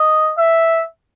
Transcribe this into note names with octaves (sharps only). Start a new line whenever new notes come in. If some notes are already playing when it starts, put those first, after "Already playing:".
Already playing: D#5
E5